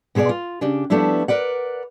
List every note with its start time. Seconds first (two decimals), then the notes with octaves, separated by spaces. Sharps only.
0.15 B2 B3 G#4 C5 D5
0.29 F4
0.61 C#3 D4 G4
0.90 F3 G3 A3 B3 D4 E4
1.28 A#4 B4 D5 F#5